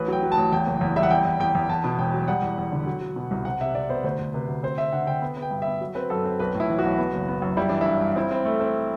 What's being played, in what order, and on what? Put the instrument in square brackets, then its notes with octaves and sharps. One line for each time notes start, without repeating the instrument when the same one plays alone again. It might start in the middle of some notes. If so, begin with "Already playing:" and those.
Already playing: [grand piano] A1 B4
F#3 G5
F#3
A5
A1
E2 G5
F#1
E2
G3 E5
F#5
E2 G5
E2
E2 G5
E2
E2 A5
B2
E1 G5
F#3
G3 F#5
E2
E2
D3
F#3
F#3
B2
C2
C3 F#5
C3 E5
C3 D5
B3 C5
D2 C5
D2
C3 B4
D2
C4 C5
C4 E5
D3 F#5
D3 G5
B3
B3
G5
G2
B3 E5
F#3
C4 B4
F#2 A4
C4
B1 B4
A2
E4
E3
B1 F#4
B3
F#1
B3
F#2
G3 E4
E3 D4
E4
G2
G2
C4 E4
C4
A3
C4